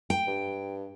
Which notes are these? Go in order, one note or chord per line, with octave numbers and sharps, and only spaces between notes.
G5
G2